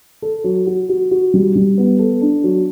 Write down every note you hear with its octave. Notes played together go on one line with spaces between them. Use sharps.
A4
F#3
F#4
F#4
F#4
G3
G3
B3
A4
D4
F#3